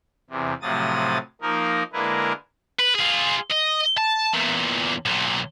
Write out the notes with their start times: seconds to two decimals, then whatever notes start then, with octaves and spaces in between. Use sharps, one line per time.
0.30 E2 C3
0.62 A2 C3 F3 F#3 D#6 A6
1.41 F3 A#3 D#4 A#4
1.93 D3 G#3 A#3 E4 A#4 B4
2.79 B4
2.95 F4 G#4
3.50 D#5
3.97 A5
4.33 E2 A#2
5.05 B1 A#2